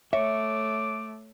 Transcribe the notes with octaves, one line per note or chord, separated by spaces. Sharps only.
A3 C#5 E5 D6